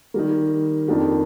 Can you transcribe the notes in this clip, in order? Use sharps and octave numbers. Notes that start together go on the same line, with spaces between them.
D#3 G3 A#3
F2 D#3 A#3 D4 G4